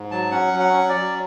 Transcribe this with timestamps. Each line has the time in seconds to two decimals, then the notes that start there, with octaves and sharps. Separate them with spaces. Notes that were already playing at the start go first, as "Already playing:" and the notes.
Already playing: G#2
0.11 F#3 A5
0.31 C#4 F#5
0.54 F#3
0.60 F#5
0.74 C#4
0.89 D5
0.96 F#3